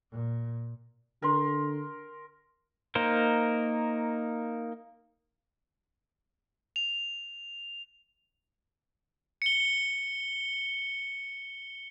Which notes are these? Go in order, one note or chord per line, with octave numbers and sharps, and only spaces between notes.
A#2
D3 A#4 C6
A#3 D#4 A#4 C5
F7
C#7 G7